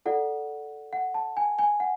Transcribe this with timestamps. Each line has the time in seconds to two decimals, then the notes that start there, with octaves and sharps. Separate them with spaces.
0.06 F4 A4 D5 F#5
0.93 F#5
1.14 A5
1.37 G#5
1.59 G#5
1.80 F#5